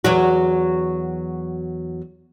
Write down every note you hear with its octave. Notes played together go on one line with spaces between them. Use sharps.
E2 F#3 F#4